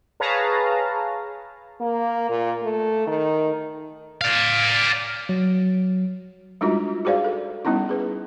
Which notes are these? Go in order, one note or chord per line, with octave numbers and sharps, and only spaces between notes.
G#4 B4 C#5 F5 A5 A#5
A#3
A#2
A3
D#3
D5 F5
F#3
G3 G#3 D4 D#4 F4 F#4
F#4 G#4 C5 D5 F5
A4
G3 B3 C#4 D#4 E4
G#4 B4